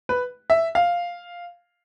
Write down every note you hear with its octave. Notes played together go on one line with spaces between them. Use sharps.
B4
E5
F5